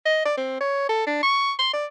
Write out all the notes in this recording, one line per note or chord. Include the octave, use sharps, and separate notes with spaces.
D#5
D5
C4
C#5
A4
D4
C#6
C6
D5